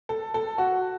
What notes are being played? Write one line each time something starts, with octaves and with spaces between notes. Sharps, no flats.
A4
A4
F#4